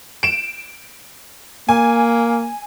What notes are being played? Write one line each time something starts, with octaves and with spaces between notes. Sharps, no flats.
D7 E7
A#3 G#5